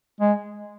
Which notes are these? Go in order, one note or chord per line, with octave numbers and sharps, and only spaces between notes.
G#3